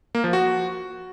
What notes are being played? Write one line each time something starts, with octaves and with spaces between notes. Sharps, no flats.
A#3
F3
F#4